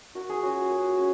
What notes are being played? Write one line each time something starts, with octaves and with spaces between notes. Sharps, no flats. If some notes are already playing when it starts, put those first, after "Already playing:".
A#3 F#4
G#4
C#4 F4 F#4
A#3
C#4